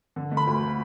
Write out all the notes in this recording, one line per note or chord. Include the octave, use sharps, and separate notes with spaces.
D3
A3
B5
D2